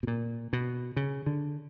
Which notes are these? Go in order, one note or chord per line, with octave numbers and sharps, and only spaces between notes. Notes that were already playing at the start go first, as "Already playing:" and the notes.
B2
A#2
B2
C#3
D3